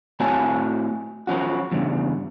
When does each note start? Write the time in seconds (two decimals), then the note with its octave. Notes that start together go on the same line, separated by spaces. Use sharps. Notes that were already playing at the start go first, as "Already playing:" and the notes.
0.20 A2 C4 F#4 C#5 G#5 A5
1.27 F3 C#4 F#4
1.72 E2 G2 C#3